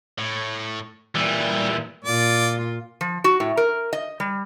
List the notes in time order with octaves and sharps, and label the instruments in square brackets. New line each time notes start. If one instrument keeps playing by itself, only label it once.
[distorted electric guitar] A2
[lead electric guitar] A#2 E3 [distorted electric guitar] G3
[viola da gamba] A#2 F4 [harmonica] D5
[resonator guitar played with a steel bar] F3
F#4
A2
A#4
D#5
G3